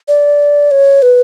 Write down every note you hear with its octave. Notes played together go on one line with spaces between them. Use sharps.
D5
C#5
B4